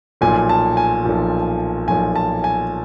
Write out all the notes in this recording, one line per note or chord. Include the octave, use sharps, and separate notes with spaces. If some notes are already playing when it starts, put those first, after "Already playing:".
B1 A#2 F3 G#5
A5
G#5
B1 A#2 F3
B1 A#2 F3 G#5
A5
G#5